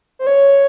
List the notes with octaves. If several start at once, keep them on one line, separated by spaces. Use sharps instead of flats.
C5
C#5